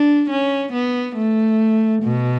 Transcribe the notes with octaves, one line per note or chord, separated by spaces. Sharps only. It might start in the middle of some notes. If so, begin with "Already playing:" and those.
Already playing: D4
C#4
B3
A3
B2